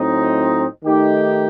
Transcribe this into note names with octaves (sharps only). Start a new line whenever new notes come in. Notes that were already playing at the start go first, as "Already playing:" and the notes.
Already playing: A2 F#3 C4 D#4
D#3 A3 D#4 G4